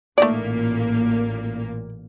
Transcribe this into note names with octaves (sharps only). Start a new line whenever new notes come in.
A1 A#2 A3 A#3 D#4 D5